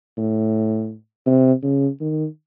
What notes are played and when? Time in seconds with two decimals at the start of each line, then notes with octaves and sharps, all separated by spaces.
0.18 A2
1.27 C3
1.63 C#3
2.01 D#3